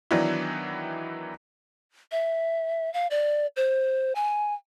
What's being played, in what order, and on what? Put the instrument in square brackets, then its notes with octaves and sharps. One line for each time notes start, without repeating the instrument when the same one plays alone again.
[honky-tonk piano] D#3 E3 F#3 B3 D4 E4
[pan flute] E5
F5
D5
C5
G#5